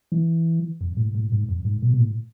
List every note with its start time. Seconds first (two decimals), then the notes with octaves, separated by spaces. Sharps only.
0.12 E3
0.81 F2
0.97 A2
1.15 A2
1.32 G#2
1.49 F2
1.65 G#2
1.82 B2
1.94 B2
1.99 A2